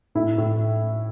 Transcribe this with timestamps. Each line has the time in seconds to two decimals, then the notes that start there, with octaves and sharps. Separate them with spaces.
0.15 A2 E4
0.38 A2